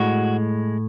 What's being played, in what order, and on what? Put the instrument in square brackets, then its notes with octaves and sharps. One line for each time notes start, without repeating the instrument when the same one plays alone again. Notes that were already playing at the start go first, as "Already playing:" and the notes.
Already playing: [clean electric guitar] A2 G#3 F#4